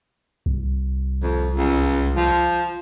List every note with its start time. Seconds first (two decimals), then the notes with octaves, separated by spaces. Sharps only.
0.46 C2
1.22 F2
1.56 C#2
2.17 F3